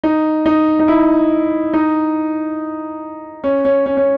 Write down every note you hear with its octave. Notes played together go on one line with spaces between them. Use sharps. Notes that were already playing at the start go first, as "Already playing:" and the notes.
D#4
D#4
D#4
E4
D#4
C#4
C#4
C#4
C#4